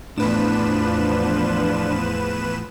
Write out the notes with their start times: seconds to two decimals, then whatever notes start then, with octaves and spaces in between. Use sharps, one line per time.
0.18 E2 A2 F3 B3 D4 B4 E7